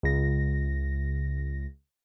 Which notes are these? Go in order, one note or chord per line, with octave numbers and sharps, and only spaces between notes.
C#2 C#3 A#6